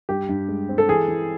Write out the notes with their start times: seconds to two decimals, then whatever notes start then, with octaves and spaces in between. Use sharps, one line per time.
0.09 G2 G4
0.29 G2
0.49 G#3
0.69 C4
0.78 A4
0.88 E3 G#4
1.08 E3